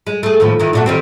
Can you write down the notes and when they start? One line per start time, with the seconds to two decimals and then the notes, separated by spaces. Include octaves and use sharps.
0.07 G#3
0.23 A3 G#4
0.40 D#2 A2 F3
0.60 D#3 E3
0.73 A#2 A3 F#4
0.86 D#3 G3 C4